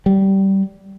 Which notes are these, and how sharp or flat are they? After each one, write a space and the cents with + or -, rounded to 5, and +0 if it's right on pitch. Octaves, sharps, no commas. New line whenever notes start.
G3 -15